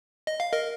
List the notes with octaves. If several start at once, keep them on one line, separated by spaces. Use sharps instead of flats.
D#5
F5
A#4 D#5